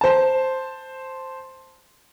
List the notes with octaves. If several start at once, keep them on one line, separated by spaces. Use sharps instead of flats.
C5 A5